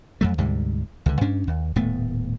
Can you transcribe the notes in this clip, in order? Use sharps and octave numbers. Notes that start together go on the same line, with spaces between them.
F2 F#3 A3
D2 G#2 C3 G3
C#2 D3
G2 C#4 D4
D#2
D#1 A2 A3 B3